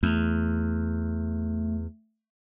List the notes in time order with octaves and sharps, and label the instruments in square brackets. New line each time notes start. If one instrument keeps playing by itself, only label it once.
[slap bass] E2 [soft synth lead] A3